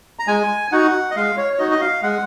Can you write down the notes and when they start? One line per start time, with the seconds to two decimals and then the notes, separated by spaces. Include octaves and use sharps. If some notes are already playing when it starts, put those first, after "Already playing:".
0.19 A#5
0.28 G#3 G#5
0.72 D#4 F#4 F#5
1.11 D#5
1.16 G#3 F5
1.37 C#5
1.53 C#5
1.59 D#4 F#4 D#5
1.71 D#5
1.81 F5
2.02 G#3 F#5